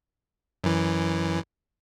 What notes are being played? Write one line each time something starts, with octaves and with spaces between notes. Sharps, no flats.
F#2 E3